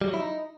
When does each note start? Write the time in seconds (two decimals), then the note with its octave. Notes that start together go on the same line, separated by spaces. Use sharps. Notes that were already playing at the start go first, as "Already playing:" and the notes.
0.01 G3
0.08 F#3
0.14 E4
0.20 D#4